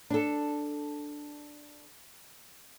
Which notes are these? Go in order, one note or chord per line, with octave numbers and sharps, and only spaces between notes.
D4 A4